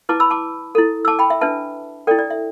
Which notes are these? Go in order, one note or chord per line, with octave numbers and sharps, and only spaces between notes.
E4 B4 A5 D6
B5 E6
A5 D6
E4 A4
E6
A5 D6
G5 B5
E5
D4 B4 E5 A5
E4 A4 D5 G5
D5
E5